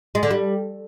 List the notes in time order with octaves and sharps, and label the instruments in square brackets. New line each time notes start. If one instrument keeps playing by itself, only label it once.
[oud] G#3
D3
G3